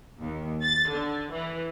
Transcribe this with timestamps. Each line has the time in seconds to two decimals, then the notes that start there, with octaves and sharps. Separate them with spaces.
0.21 D#2
0.62 A6
0.91 D3
1.33 E3